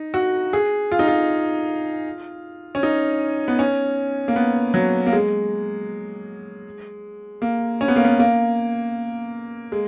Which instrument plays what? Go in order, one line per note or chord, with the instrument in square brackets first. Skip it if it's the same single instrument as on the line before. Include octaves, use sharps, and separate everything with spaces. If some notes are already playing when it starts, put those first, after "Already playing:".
Already playing: [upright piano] D#4
F#4
G#4
F4
D#4
F4
C#4
D#4
B3
C#4
A#3
B3
F#3
A#3
G#3
A#3
C#4
B3
A#3
B3
A#3
G#3